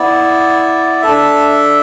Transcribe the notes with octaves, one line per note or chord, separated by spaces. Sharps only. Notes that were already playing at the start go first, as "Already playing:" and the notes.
Already playing: B3 E4 D5
D4 A4 E5